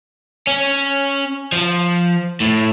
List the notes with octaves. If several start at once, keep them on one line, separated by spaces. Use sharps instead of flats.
C#4
F3
A2